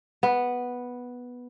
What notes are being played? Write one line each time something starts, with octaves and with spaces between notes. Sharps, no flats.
B3